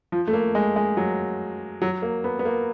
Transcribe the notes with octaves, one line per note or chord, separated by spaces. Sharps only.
F3
A3
A#3
G#3
G#3
F#3
F#3
A#3
B3
B3
A#3